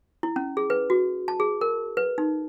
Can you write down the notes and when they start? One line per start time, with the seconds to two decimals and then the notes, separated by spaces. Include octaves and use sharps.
0.23 E4
0.36 C#4
0.57 G#4
0.70 B4
0.90 F#4
1.28 A5
1.40 G#4
1.61 A#4
1.97 B4
2.18 D#4